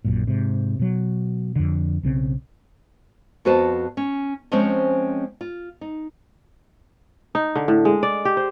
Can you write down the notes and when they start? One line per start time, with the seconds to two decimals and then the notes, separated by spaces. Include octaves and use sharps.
0.05 A#1 F#2 A#2
0.27 G#2 C3
0.79 B2 F#3
1.56 F2 D3
2.03 B1 C#3 C4
3.45 F2 B3 F#4 B4 C5 A5
3.97 C#4
4.52 F3 G#3 C4 C#4 C5 C#5
5.41 F4
5.81 D#4
7.35 D#4
7.56 D3
7.68 A2
7.85 G#3
8.03 D5
8.25 G4
8.37 C5